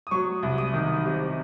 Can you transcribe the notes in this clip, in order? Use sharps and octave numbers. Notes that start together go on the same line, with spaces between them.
D#6
F#3 C#6
C2
D#6
D#3
C3